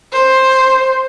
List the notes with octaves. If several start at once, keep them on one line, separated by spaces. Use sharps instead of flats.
C5